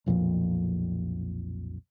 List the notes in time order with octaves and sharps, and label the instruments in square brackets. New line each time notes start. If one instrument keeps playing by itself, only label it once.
[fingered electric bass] B1 F2 A#2 F3